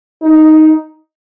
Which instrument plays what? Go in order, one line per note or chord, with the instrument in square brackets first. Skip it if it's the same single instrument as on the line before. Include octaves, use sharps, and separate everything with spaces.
[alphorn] D#4